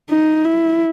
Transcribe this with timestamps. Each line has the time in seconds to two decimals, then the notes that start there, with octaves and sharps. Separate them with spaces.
0.10 D#4
0.45 E4